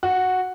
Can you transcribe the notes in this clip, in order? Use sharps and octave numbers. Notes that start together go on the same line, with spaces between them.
F#4